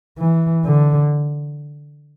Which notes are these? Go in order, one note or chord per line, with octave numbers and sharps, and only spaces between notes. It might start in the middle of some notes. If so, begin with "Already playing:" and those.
E3
D3